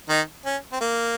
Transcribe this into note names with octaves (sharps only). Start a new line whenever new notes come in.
D#3 D#4
C#4
C4
A#3